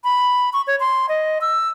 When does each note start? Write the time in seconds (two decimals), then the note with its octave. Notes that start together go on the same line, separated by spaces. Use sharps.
0.04 B5
0.53 C#6
0.67 C#5
0.80 C6
1.09 D#5
1.41 E6